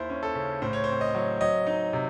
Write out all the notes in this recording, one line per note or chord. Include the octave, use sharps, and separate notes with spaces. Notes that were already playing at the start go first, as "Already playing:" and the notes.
Already playing: D#2 E4 C5
C#4
A4
C#3
A2 C5
C#5
C4 C5
D#5
F#3
F#3 D#5
D#4
C3